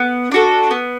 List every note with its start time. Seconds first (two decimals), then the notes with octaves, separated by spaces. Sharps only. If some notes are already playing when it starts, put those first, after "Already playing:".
Already playing: B3
0.31 D4 F#4 A4
0.71 B3